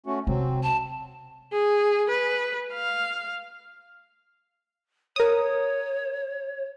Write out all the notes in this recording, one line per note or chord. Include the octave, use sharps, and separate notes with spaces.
A3 C#4 F#4
C3 F#3 C4
A5
G#4
B4
F5
A#4 C#5 D#6